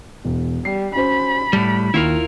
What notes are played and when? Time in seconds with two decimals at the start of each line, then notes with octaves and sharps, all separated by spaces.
0.25 E1
0.65 G3 C7
0.95 C#4 F#4 C5 B5
1.53 A2 G3 A5
1.94 D#2 E4 F4 A#4